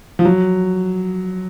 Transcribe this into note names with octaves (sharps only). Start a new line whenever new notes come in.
F3
F#3